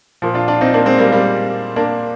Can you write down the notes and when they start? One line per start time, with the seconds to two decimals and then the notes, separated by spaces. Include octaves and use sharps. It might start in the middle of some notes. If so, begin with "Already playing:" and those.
0.22 A#2 F3
0.34 D4 F4
0.48 D4 F4
0.61 C4 D#4
0.74 A#3 D4
0.86 G#3 C4
0.99 G3 A#3
1.12 G3 A#3
1.76 A#3 D4